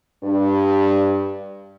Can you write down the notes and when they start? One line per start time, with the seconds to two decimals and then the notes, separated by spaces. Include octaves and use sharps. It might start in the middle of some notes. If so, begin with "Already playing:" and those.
0.24 G2